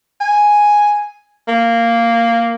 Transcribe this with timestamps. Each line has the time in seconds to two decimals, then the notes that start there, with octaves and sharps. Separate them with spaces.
0.21 G#5
1.48 A#3